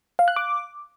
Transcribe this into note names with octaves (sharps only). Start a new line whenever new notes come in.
F5
F#6
D6